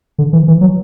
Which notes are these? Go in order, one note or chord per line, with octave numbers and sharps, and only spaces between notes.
D3
E3
E3
F#3